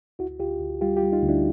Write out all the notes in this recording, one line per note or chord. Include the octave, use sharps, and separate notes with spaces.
D2 E4 F#4
D2 F4 G4
D2
G3 F4 G4
F4 G4
G3
D#4 F4
D2
D4 E4